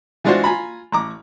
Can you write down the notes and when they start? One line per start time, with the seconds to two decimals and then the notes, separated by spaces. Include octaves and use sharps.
0.24 E3 G#3 D4 F4 F#4 C5
0.44 F4 G#5 A#5 B5
0.92 A1 A#5 D6